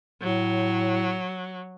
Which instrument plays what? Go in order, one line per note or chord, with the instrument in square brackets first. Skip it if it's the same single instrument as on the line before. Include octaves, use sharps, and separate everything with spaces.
[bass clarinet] A2 [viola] F#3